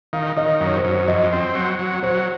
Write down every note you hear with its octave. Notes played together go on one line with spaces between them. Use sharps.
D#3 F5
D#3 D#5
F#2
C#5
C5
F#2
C5
F2 D#5
C4
F#3
F#3
F#3 C5